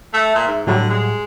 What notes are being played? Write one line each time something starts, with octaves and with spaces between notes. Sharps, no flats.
A3 E5
A#2
G#2
A2 D3 F#3 G3
G#3